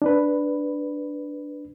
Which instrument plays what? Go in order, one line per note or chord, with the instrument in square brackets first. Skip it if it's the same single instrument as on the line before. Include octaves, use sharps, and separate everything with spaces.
[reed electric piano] D4 B4